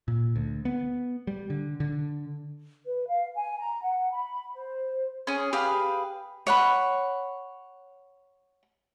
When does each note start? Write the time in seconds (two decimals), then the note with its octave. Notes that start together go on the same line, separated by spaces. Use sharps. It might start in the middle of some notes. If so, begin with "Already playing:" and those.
0.08 A#2
0.36 D2
0.65 B3
1.27 G3
1.50 D3
1.80 D3
2.86 B4
3.08 F5
3.35 G#5
3.59 A#5
3.82 F#5
4.12 B5
4.54 C5
5.27 C#4 G#4
5.53 G4 G#4 B4 F5
6.47 C#5 F#5 B5